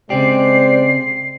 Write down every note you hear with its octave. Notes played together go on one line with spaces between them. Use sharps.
C#3 G#3 C4 G4 C5 D5 C7